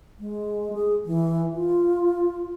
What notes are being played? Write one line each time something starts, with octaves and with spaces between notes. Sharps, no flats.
G#3
G#4
E3
F4